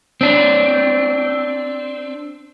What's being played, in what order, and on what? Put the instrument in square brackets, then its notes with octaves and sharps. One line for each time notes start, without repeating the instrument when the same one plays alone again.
[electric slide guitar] C4 D4